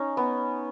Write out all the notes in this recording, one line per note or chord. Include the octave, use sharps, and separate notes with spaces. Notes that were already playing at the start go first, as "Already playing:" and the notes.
Already playing: C#4 D#4
B3